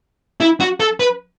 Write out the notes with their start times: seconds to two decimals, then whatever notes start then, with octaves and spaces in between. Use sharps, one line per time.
0.41 E4
0.60 F#4
0.80 A4
1.00 B4